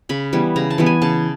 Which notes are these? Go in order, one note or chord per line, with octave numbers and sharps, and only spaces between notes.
C#3 B5
E3 G3 B3
C#3 A#5
A5
E3 G3 B3
G#5
C#3 A5